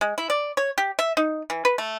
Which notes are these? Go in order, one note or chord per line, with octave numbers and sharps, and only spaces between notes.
G#3
E4
D5
C#5
G4
E5
D#4
E3
B4
A3